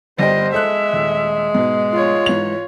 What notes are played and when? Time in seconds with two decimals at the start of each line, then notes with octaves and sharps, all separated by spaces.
0.19 G1 G3 C5 D#5 G5
0.54 G#3 A4 E5 F#6
0.93 D#1
1.55 G#2 B2
1.93 F4 C#5
2.26 G#2 E3 F7